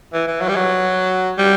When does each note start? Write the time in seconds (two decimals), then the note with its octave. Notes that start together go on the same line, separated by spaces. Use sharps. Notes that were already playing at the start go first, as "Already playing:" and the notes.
0.13 E3
0.27 E3
0.41 F#3
0.49 G3
0.56 F#3
1.38 G3